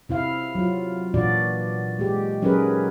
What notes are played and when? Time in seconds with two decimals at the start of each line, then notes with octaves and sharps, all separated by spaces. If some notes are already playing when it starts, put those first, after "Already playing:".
0.09 C3 E4 F5
0.55 F#3 F4
1.14 A#2 E3 D4 F#4 D5
1.99 G#3 G4
2.42 F#3 C#4 D#4 G#4 A#4 B4